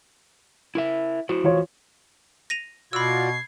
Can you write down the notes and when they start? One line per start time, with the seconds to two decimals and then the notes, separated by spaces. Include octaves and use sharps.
0.75 E4 A#4 E5
1.29 E4 F#4 C5
1.44 E3 F4 C#5
2.50 A#6 D#7 F7
2.93 B2 F4 F#4 D5 B5 E6 G#6 C7